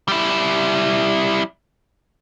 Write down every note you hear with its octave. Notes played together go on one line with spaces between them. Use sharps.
G3 E4